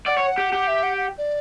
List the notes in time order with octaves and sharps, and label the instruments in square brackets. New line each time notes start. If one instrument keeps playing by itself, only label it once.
[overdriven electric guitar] D5 [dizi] F#5
[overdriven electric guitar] C#5
G4
G4
[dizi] E5
F#5
F#5
D5